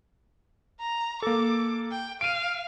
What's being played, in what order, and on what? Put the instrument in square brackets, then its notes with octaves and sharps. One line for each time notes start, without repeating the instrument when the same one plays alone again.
[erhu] A#5
[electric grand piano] A#3 A4 [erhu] D6
[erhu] G5
[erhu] F5 [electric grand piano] D7 D#7